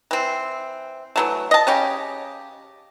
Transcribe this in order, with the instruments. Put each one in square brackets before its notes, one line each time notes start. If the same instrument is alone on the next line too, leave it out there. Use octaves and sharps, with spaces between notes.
[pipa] E3 C4
E3 F#3 A3
D#5 A5
C#3 C#4 G4